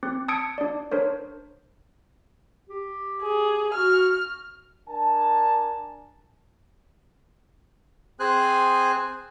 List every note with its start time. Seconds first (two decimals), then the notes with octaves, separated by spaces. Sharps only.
0.03 C4
0.28 A5 D#6 E6 G#6 C#7 D7
0.58 D4 D5
0.91 D4 A#4 C5 C#5
2.69 G4
3.22 G#4
3.74 F#4 F6
4.88 D4 A#4 G#5 A5
8.20 C4 G#4 C5 G#5 F#6